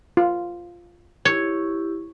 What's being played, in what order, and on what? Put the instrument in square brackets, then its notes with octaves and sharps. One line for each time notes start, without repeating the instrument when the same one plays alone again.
[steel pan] F4
[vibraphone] E4 G4 [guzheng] C#5